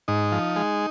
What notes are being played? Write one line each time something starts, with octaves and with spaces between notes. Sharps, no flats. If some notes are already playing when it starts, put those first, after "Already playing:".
G#2 D#4
F3
G#3